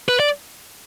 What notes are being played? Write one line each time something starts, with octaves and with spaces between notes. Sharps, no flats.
B4
D5